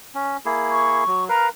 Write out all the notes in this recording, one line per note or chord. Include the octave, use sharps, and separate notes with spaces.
C#4
A#3 E4 G#4
C#6
F#3
A#4 B4 F5 A#5